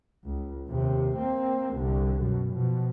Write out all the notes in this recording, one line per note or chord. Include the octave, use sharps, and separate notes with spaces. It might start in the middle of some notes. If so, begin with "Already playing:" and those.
C#2
D#2 C3
A#3 C4
C2 D3
F#2 B2
B2 F3